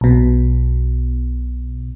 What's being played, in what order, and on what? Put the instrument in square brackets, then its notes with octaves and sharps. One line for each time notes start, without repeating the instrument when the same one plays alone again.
[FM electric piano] B1 B2